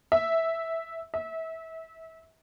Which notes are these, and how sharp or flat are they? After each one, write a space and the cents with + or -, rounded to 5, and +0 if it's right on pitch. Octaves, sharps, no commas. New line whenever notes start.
E5 -5
E5 -25